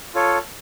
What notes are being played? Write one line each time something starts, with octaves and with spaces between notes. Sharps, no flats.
F4 A4 C#5